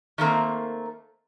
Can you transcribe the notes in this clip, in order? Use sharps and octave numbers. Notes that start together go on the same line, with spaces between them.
D#3 A3 A#3 C4